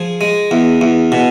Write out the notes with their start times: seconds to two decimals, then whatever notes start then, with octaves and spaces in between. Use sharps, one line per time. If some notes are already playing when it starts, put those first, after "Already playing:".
Already playing: F3 G#4
0.21 G#3
0.51 E2
0.81 E2
1.12 B2